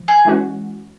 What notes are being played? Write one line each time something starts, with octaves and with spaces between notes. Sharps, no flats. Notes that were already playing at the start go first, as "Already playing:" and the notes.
Already playing: F3
G#4
E3 G#3 C#4 F#4